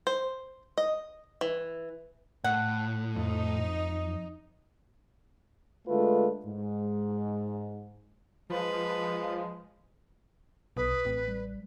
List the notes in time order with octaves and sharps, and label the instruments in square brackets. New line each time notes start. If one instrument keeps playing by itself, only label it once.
[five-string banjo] C5
D#5
E3
[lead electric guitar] A2 [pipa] F#5
[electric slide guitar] F2 [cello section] D#4
[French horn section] D3 G#3 A3 F4 B4
G#2
[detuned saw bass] F3 [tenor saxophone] G#3 [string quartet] B4
[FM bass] B1 [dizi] B4 [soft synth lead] D#6
[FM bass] A1 [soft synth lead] C4
[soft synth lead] G3